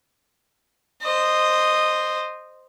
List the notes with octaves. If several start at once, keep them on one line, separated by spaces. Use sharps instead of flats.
C5 D#5